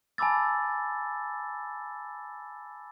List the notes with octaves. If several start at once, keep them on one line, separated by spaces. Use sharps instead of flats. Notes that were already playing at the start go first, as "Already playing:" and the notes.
G#5 A5 B5 D6 E6 A6